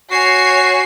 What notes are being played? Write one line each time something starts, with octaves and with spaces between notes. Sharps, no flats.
F#4 C#5 G#5 C7